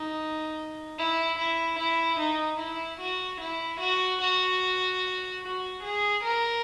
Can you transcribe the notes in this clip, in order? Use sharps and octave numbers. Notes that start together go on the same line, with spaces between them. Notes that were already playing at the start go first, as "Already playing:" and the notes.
Already playing: D#4
E4
E4
E4
D#4
E4
F#4
E4
F#4
F#4
F#4
G#4
A#4